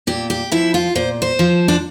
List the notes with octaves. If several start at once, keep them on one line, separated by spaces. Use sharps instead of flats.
A#2 G4
G4
F3 E4
F4
A#2 C5
C5
F3
D4